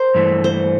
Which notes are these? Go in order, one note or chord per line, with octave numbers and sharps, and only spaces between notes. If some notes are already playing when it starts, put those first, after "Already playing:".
Already playing: A#4 C5
G2 E3 A3
C5